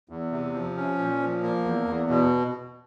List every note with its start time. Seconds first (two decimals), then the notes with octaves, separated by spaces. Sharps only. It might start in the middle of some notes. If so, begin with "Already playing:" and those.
0.09 E2
0.32 C3
0.53 F3
0.76 C#4
0.98 A#2
1.20 F3
1.43 A#3
1.64 E2
1.87 E2
2.09 B2